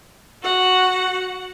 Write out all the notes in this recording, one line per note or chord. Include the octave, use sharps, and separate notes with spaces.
F#4 F#5